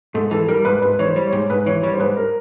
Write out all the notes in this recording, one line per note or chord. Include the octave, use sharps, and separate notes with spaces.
G#2 A4
E3 A4
G3 A#4
G#2 B4
G#2 B4
E3 C#5
C5
G3
C#5
G#2
G#2 B4
E3 C#5
G3 C#5
C5
G#2 B4
A#4